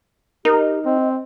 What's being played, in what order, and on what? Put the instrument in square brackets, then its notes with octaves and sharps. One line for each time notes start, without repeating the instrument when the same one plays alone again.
[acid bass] D#4 [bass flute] G4 [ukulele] A#4
[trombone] C4 [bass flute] D#5